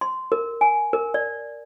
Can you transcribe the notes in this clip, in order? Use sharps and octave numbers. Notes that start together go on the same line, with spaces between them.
C6
A#4
G#5
A#4
D5